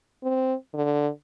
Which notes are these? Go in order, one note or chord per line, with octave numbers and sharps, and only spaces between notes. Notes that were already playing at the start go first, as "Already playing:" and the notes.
C4
D3